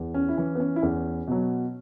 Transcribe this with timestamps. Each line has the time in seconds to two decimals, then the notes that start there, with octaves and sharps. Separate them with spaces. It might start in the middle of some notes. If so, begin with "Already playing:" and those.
Already playing: E2
0.14 C#4
0.29 E4
0.38 E3 C#4
0.55 B3
0.60 C#4
0.76 E4
0.82 E2 C#4
1.27 B2 F#3